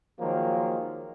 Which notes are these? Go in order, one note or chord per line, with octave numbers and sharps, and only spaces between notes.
D#3 F3 F#3 G#3 A#3